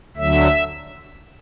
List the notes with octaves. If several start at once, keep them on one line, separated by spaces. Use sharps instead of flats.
D2 D3 F#3 E5